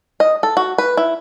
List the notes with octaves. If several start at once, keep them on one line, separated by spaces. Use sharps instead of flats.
D#5
A4
F#4
B4
E4